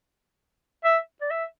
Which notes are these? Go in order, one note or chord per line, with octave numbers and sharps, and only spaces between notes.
E5
D5
E5